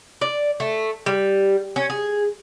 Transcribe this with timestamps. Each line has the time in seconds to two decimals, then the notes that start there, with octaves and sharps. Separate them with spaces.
0.21 D5
0.60 A3
1.06 G3
1.76 C#4
1.90 G#4